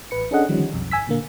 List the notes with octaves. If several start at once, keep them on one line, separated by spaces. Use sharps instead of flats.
A1 B4 C#7
C#4 D4 G#4 A4 D#5 F#5
D3 D#3 F3 G3 C#4
B1 F2
G1 G#5 E6 B6
A#2 D3 A#3